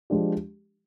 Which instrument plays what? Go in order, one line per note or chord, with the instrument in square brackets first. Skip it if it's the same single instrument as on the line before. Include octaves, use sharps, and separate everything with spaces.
[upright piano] F3 G#3 D4 G4